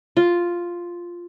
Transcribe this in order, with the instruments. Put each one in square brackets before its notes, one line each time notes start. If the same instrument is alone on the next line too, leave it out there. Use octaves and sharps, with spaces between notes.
[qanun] F4